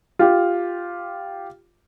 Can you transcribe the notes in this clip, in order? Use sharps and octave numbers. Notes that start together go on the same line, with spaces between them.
F4 G4